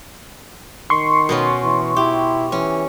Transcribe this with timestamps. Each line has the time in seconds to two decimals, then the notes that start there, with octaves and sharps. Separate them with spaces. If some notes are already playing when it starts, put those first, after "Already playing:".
0.90 D#3 C6 C#6
1.29 B2 B3 C#4
1.63 E3
1.96 E4 G4
2.52 E3 C#4